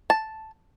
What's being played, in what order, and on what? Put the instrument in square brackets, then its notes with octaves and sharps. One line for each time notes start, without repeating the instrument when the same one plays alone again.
[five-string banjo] A5